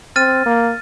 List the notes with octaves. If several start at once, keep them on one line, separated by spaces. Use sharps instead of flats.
C4 F6 A6 D#7
A#3